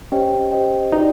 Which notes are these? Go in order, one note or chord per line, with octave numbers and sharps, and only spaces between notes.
C#4 G4 C5 D#5 G5
G4 C5 D#5 G5
D#4 F#4 B4 D5